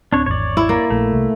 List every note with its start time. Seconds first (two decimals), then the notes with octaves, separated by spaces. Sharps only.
0.13 D1 C4 D4 C#5
0.26 G#1 E2 C#5 D5
0.57 E4
0.69 A#3
0.91 A#1 A3
1.13 C2